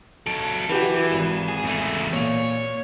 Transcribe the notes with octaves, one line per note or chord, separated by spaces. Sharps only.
F#3 A4 D7
E3 F#4 G4 B4
G#1 E7
G#4
E2 A3
A#2 C#5 F7